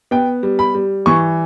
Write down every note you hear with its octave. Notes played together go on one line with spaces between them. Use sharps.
B3 G5
G3
B5
G3
E3 C#6